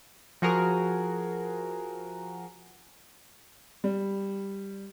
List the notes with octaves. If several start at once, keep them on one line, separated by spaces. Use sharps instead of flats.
F3 F#4 G#4 A#4
G3